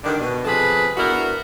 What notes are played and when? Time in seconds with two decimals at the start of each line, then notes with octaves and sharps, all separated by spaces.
0.04 G2 D3 D#3 D4
0.21 B2
0.45 C3 F3 G#4 A4 B4
0.97 B3 D4 E4 F#4 A#4